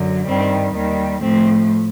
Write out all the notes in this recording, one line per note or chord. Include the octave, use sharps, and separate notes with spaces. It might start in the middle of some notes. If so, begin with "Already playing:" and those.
Already playing: F#2 D3 F#3
G2 D#3 G3 C4
D#2 D#3 G3
A2 F3 A3 C4